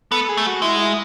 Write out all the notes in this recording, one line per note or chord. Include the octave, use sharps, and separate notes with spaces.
B3 A4
G#4
A3
F#4
G#3 E4
E4